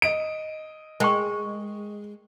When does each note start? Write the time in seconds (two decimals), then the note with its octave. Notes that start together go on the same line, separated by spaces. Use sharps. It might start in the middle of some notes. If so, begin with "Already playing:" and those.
0.02 D#5 D7
1.00 G#3 A#4 G5 C#6